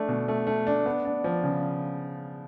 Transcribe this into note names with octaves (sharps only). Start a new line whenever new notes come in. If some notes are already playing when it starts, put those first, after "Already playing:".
Already playing: A3 D4
B2
A3
A3
D4
B3
D4
F3
C#3